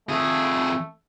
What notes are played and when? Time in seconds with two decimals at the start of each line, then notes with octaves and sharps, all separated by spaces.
0.09 F2 A3 G#4